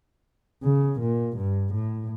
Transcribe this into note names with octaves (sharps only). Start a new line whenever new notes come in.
C#3
A#2
G2
A2